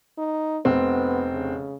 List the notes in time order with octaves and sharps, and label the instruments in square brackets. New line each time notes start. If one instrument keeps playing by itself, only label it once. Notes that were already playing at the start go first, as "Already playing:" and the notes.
[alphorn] D#4
[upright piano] F1 C4 [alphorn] B3
[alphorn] C#3